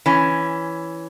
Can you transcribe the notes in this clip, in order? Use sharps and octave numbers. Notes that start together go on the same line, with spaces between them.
E3 C#4